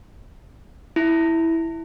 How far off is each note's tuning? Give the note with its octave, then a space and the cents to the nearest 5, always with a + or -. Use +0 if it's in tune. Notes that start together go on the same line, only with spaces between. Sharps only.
E4 -5